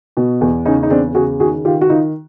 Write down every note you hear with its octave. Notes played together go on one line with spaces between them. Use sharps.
B2
E2
C#3 C#4 D#4
D#4
E2 C4 D4
C#3 F#4 G#4
D#3 F#4 G#4
D#3 F4 G4
F#4
D#3 D#4 F4